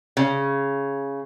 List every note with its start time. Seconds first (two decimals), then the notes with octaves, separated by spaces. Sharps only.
0.17 C#3